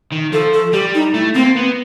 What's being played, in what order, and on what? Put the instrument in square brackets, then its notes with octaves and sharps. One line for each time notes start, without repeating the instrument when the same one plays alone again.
[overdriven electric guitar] D#3
[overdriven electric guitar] F3 [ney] A4
[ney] A4
[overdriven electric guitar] G3 [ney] G4
[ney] D#4
[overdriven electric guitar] A3 [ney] E4
[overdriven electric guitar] A#3 [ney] C4
[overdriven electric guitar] B3